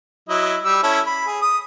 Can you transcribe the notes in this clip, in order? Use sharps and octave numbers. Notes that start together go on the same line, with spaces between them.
F#3 E4 D#5
G3 E6
C#4 E4 A4
B5
G#4
D#6